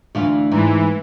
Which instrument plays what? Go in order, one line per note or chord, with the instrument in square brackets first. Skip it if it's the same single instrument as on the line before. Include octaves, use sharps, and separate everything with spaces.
[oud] D2 E3 F4
[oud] G#2 [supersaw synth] E3